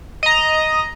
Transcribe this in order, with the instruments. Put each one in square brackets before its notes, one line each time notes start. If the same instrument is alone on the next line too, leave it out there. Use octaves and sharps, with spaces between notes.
[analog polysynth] D#5 A#5